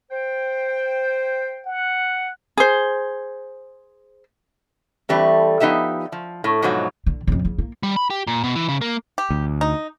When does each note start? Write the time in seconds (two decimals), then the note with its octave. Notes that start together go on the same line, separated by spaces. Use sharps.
0.11 C5 G5
1.66 F#5
2.57 G#4 C5
5.09 E3 G3 A3 C4
5.60 F3 B3 D#4 G4 E5
6.12 F3
6.44 A2
6.62 G#2 B2 F3 F#3
7.06 D3
7.27 F2 C#3
7.45 C#3
7.58 A#3
7.83 G3
7.96 B5
8.10 G4
8.27 A#2
8.44 B2
8.56 E3
8.69 C#3
8.81 A#3
9.18 G4
9.30 D2
9.61 D#4